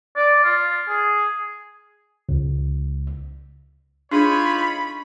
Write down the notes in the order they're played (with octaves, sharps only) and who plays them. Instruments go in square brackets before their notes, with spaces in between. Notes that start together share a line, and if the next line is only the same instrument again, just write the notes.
[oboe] D5
F4
G#4
[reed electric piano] C#2
[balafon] D4 G#4 [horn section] D#4 F4 C#5 [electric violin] B5